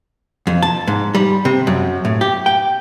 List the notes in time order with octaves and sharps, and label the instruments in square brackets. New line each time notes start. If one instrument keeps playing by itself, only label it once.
[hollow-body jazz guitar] F2
A5
G#2
G3
C3
F#2
A2
G4
G5